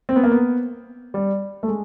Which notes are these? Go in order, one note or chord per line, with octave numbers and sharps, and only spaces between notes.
C4
B3
A#3
B3
G3
A3
G#3